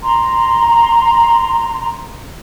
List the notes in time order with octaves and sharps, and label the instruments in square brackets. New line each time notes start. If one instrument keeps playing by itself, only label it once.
[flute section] A#5 C6